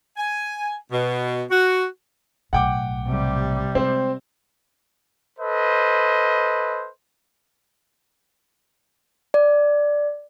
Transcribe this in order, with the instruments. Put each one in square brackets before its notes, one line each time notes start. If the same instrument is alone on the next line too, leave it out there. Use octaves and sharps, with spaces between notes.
[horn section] G#5
B2
F#4
[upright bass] B1 A2 [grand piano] F#5 G5 D6
[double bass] C3 G3
[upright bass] G#3 [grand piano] C4 C5
[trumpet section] A4 B4 C5 D#5
[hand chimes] D5